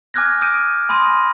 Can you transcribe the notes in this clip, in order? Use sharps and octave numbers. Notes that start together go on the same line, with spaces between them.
G#5 D6 F6 F#6 G#6 A#6
D#6 F6 G6 D7 D#7
G#5 B5 C6 D#6 A#6 D#7